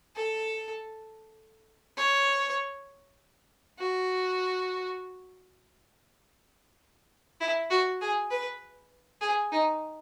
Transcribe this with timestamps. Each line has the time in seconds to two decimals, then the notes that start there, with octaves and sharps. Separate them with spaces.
0.16 A4
1.97 C#5
3.79 F#4
7.41 E4
7.70 F#4
8.01 G#4
8.31 B4
9.21 G#4
9.52 D#4